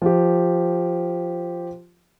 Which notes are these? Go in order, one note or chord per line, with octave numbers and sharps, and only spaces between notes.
F3 G4